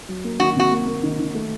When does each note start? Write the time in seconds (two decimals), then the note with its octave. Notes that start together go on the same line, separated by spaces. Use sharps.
0.09 F#3
0.24 A#3
0.40 D#3 F#4
0.56 C3 F#4
0.72 A#3
0.88 A#3
1.03 D#3
1.19 D#3
1.35 A3